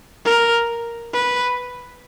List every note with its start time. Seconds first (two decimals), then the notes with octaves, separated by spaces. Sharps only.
0.25 A#4
1.13 B4